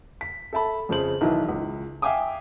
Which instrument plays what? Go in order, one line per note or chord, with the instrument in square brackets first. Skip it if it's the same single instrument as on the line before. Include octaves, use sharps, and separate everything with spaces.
[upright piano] B6
A4 E5 A5 B5
F2 C#3 C5 F#7
B1 D#3 E3 E4 B4
C#2
E5 F5 G5 G#5 D6 D#6